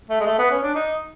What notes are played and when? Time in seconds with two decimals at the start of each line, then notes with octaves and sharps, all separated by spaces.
0.10 A3
0.20 G#3
0.26 A3
0.39 B3
0.51 C#4
0.63 D4
0.75 D#4